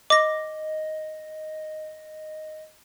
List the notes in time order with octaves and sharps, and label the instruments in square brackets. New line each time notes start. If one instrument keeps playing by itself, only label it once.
[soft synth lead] D#5 [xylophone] D6 A#6